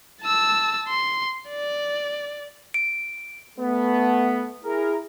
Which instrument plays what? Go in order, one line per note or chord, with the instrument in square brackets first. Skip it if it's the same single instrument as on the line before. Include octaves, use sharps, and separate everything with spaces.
[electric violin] A5 E6
C6
D5
[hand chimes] D7
[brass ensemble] A3 B3
E4 G#4 A#4